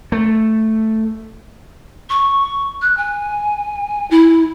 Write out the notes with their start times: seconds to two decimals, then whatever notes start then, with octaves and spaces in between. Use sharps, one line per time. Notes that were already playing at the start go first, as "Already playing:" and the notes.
0.12 A3
2.09 C#6
2.82 F#6
2.97 G#5
4.11 E4